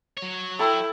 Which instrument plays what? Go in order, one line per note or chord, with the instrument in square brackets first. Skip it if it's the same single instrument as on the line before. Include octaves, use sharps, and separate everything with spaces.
[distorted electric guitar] F#3 C#5
[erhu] E4 [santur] A4 [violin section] G5